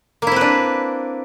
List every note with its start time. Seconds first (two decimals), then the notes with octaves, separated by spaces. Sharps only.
0.22 A#3
0.27 E4
0.32 C4
0.36 B4
0.41 D4